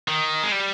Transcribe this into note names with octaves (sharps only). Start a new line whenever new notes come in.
D#3
G#3
G3